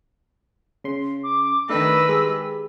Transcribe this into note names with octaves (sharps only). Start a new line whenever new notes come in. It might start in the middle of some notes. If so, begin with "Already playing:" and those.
C#3 C6
D6
D#3 A3 D4 G4 B4 E6
G#3 G4